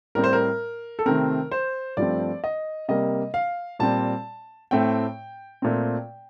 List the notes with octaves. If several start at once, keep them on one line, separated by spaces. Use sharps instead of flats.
A2 G3 C4 A#4
C5
A#4
A4
C3 D#3 A3 C4 A#4
C5
G2 F3 A3 C4 D5
D#5
C3 G3 A#3 D#5
F5
A#2 G3 C4 A5
A2 A3 C4 G5
A#2 A3 C4